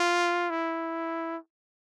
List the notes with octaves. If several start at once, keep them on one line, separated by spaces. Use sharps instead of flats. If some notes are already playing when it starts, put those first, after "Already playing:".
Already playing: F4
E4